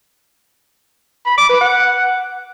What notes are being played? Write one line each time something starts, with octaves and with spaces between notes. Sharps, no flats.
B5
D6
B4
F#5